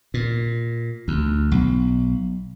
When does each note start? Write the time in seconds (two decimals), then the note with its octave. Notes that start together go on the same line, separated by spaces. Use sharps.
0.14 A#2
1.08 D2
1.52 B1